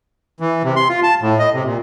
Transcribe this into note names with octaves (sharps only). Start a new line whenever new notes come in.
E3
C3
C6
F4
A5
A2
D#5
C3
A#2